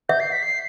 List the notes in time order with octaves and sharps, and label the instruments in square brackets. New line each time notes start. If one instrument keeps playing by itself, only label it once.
[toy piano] E5 [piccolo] G6
[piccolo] C7
B6
C7